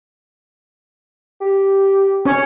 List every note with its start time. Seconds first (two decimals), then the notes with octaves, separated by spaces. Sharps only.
1.41 G4
2.25 C#4 C#5